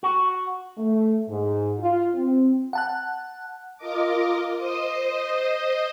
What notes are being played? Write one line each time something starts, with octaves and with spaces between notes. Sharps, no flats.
F#4
A3
G#2
F4
C4
F#5 A5 F#6
F4 A#4 D#5 D6
C5 D#5 D#6